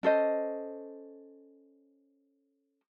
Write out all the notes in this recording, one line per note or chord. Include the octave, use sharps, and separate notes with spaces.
C#4 A4 C5 D#5